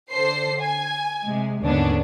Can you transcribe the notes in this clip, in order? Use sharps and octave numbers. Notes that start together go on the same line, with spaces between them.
D3 A4 C5 C7
G#5
C3 G#3
D#2 G#2 D3 B3 C#4 D4